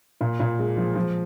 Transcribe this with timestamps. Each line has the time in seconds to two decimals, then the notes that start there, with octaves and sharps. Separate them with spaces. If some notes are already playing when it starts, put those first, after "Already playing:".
0.21 A#2
0.40 A#2
0.59 G#3
0.77 F3
0.95 F3